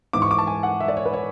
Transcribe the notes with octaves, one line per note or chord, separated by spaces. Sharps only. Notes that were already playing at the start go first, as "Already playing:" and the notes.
G#2 E3 D6
C#6
D6
A5
G#5
F#5
E5
D5
C#5
B4
C#5